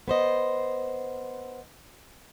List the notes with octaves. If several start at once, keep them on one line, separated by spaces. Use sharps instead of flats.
B3 C5 D#5